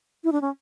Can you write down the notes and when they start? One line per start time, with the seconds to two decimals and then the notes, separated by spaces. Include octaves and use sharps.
0.24 E4
0.32 D4
0.41 C#4